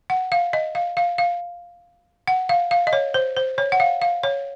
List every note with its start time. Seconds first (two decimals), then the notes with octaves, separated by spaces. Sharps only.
0.10 F#5
0.32 F5
0.53 D#5
0.75 F5
0.97 F5
1.18 F5
2.28 F#5
2.49 F5
2.71 F5
2.87 D#5
2.93 C#5
3.14 C5
3.37 C5
3.58 C#5
3.72 F#5
3.80 F5
4.02 F5
4.23 C#5